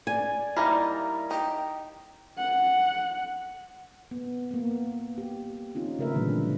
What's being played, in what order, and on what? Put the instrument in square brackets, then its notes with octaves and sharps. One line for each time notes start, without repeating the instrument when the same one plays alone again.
[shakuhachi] D5 [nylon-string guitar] G#5
[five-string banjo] G3 A#3 D#4 [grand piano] E4 A#5
[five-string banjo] D#4 [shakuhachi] G5
[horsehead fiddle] F#5
[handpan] B3
A#3 B3
G4
C4 C#4 D#4 F4
C#3 A3 A#4 B4 E5
A#2 D3 E3 F#3 G3 G#4